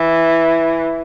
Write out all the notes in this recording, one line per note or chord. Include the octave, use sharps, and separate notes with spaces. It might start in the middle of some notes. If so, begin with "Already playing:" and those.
Already playing: E3